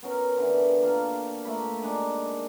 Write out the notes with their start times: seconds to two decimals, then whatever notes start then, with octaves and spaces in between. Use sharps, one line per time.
0.03 B3 C#4 A#4
0.37 D3 E3
0.68 G5
0.82 A#3 F5 A5
1.45 A3 A#3 B5
1.82 G#3 D4 D#4 G#5